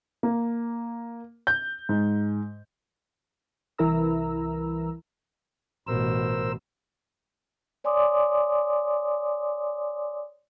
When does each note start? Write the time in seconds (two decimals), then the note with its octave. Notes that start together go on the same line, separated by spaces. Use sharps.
0.23 A#3
1.47 G6
1.89 G#2
3.78 C2 E3 E4 A#4 A#5 E6
5.87 A1 B2 A#4 C5 E6
7.84 C#5 D5 G#5 C6 D6 D#6